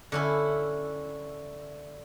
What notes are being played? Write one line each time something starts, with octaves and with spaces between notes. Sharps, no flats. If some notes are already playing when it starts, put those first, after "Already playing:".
D3 C#4 E4